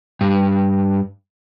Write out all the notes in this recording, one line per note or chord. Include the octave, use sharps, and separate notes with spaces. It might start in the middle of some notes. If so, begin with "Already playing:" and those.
G2